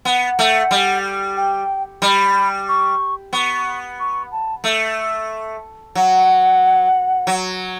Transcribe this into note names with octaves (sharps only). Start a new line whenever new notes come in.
B3 F#5
A3
G3
G5
G3 B5
C#6
B3 C#6
C#6
A5
A3
F#3 F#5
F#3